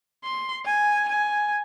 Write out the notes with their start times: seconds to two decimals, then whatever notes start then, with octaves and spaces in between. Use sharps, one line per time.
0.24 C6
0.65 G#5
1.08 G#5